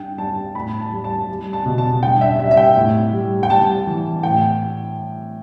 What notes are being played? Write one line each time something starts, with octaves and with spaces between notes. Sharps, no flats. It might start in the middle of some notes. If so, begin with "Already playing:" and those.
Already playing: G2 G5
G3 A5
A2 B5
A5
G3
A5
G3
A5
B2
A5
G2 G5
E5
G3 E5
E5
G5
A2
G3
G5
G3 A5
E3
A2 G5